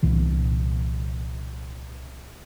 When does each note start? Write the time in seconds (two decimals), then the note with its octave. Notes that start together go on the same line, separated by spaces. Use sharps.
0.03 C2 A#2 E3